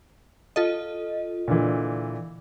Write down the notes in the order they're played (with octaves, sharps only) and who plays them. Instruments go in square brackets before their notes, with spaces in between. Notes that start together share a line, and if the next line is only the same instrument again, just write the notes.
[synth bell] F4 A4 D#5
[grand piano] A#2 D3 E3